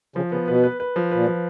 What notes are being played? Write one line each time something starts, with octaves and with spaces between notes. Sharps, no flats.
C#3 F3
C#3 B3
B2 B4
B4
B4
F3
A#2 B4
F3